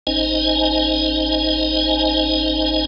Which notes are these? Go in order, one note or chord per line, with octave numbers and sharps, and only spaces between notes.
A1 C#4 D#4 C5 D#5 G#5